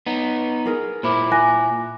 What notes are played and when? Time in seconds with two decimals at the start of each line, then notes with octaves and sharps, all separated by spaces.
0.06 B3 D#4
0.66 G#4 A#4
1.03 A#2 E4 C5 B5 D6
1.32 G#5 D6 F#6 A#6